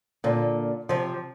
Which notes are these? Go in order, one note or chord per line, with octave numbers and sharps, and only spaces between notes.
A#2 D3
C3 F3